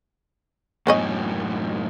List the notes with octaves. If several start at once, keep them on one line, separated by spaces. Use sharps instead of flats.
F#2 A2 B3 C#4 D#5